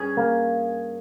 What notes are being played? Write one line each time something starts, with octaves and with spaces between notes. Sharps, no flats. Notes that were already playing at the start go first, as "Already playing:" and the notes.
Already playing: G2 C#4 G#4
A#3